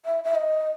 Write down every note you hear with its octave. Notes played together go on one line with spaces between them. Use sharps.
E5
E5
D#5